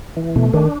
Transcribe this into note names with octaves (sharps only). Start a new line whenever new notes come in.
E3
B2 A3
D#3 D4